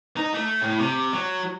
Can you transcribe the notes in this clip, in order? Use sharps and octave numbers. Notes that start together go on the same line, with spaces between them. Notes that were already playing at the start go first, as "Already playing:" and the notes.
D#4
A3
A2
C3
F#3